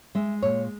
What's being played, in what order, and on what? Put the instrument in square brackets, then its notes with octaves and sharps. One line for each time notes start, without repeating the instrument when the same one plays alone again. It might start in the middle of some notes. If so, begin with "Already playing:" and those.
[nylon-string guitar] G#3 E5
A#2 C#5